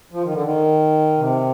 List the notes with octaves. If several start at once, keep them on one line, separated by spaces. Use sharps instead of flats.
F3
D#3
D3
D#3
C3